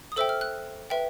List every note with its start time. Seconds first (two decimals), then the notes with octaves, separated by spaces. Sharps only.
0.12 D#6
0.16 A4 C5 E5 G5 E6
0.29 F6
0.41 F#6
0.90 B4 E5 G5